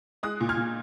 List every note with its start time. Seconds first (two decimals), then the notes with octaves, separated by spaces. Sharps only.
0.23 G#3 D#6 F#6
0.41 A#2
0.49 F6 G#6
0.57 A#2